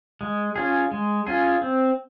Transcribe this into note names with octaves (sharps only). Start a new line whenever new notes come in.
G#3
C#4 F4 G#4
G#3
C#4 F4 G#4
C4